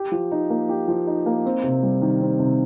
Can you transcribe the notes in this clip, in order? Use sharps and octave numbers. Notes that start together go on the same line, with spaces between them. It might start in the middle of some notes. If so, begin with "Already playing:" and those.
Already playing: G4
F3
D#4
A#3
G4
F3
D#4
A#3
C4
C3
G3
D#3
C4
C3